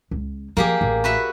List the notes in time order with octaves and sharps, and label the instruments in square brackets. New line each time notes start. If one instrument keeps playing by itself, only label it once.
[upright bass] C#2
[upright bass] F3 [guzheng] A#3 G4 G#4
[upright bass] A1 A3
[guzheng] F#4 B4 E5